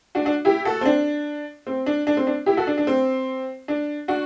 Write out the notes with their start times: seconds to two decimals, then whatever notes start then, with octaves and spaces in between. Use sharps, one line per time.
0.15 D4 F#4
0.25 D4 F#4
0.45 E4 G4
0.65 F#4 A4
0.81 C4
0.86 D4
1.67 C4
1.86 D4
2.07 D4
2.17 C4
2.27 D4
2.46 E4 G4
2.57 F#4 A4
2.67 D4
2.78 D4
2.87 C4
3.68 D4
4.08 D4 F#4